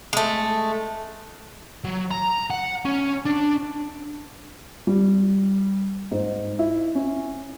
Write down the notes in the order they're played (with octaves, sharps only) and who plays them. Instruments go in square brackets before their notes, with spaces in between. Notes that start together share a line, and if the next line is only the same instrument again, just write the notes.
[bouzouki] G#3 A3
[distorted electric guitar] F#3
A#5
F#5
C#4
D4
[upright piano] G3
G#2
E4
C#4